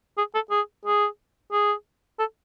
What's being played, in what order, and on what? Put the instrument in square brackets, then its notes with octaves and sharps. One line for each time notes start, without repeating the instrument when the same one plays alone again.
[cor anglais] G#4
A4
G#4
G#4
G#4
A4